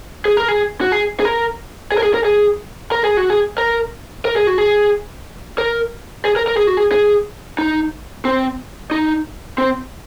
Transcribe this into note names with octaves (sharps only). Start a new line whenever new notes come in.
G#4
A#4
G#4
F#4
G#4
G#4
A#4
G#4
A#4
G#4
A#4
G#4
A#4
G#4
F#4
G#4
A#4
A#4
G#4
F#4
G#4
A#4
G#4
A#4
A#4
G#4
F#4
G#4
G#4
D#4
C4
D#4
C4